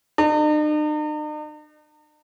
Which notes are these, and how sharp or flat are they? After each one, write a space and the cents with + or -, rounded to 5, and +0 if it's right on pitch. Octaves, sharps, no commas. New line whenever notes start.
D#4 -45